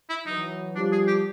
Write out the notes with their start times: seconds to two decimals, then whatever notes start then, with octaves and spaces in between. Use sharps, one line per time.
0.10 E4
0.26 E3 F#3 D#4
0.76 F3 G3 D4
0.92 G#4
1.08 G4